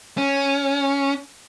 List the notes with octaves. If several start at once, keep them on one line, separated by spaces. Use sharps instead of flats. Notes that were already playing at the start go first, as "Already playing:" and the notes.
C#4